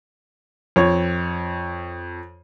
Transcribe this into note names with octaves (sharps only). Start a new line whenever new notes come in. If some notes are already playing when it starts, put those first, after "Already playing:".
F2 C#5